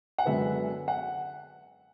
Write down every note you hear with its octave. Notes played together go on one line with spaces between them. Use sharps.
F#5
F#2 D3 G#3 B3 E5
F#5